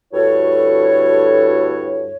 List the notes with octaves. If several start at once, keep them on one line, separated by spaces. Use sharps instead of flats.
D2 G2 E4 F#4 A4 C#5